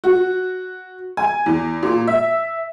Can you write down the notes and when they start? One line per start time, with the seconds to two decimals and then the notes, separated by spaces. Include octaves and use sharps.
0.04 F#4
1.17 G#5
1.46 E2
1.83 A#2
2.07 E5